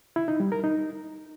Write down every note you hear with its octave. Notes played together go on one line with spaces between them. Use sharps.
E4
D#4
G3
A#4
D#4